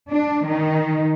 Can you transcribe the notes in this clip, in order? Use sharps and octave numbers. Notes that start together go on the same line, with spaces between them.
D4
D#3